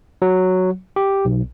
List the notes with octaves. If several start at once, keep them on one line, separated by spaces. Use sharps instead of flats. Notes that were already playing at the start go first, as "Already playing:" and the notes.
F#3
G4
B1